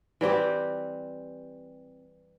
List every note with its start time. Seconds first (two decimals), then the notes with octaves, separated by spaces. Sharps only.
0.21 E3 G3 C4 G4